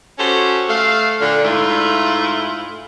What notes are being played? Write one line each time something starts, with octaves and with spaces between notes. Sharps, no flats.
C#4 F#4 G4 A4 C5
A3 F5
A#2 D3
G#2 A3 E4 F4